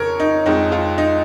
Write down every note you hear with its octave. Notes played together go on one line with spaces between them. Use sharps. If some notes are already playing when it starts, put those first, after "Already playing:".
Already playing: F2 C#3 F3 A#4 C#5
D#4
F2 F3 G#3 D#4
F4
D#4